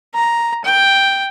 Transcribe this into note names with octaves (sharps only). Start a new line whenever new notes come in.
A#5
G5